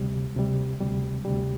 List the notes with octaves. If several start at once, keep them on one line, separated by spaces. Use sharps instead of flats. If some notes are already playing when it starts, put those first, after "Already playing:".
Already playing: D2 C3 G3
D2 C3 G3
D2 C3 G3
D2 C3 G3